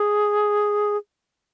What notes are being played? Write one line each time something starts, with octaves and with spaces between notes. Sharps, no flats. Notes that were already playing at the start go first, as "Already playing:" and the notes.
Already playing: G#4